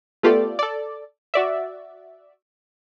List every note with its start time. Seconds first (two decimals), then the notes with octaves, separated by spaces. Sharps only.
0.23 A3 B3 F4 G4 A4 D5
0.59 A4 D5
1.34 F#4 D5 E5